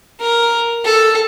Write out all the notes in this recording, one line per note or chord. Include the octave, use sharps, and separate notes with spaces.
A#4
A4